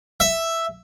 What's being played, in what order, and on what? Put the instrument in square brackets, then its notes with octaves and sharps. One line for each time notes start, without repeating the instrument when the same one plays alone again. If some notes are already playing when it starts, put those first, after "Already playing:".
[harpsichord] E5